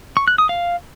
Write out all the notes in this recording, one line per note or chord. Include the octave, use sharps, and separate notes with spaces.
C#6
F#6
D#6
F5